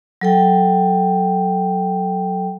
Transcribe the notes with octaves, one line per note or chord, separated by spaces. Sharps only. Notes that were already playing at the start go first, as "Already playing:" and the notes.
F#3 A4 G5